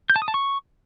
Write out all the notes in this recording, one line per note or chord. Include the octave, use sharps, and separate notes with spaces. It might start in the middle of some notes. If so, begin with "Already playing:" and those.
G6
A5
D#6
A5
C#6